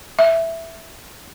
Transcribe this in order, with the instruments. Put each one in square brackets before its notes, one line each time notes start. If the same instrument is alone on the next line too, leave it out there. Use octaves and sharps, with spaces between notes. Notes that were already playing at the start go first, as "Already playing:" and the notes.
[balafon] E5